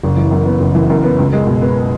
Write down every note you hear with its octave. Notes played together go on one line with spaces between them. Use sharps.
F#1
E3
F#2
B3
F#1
E3
F#2
B3
C#2
G#3
B2
B3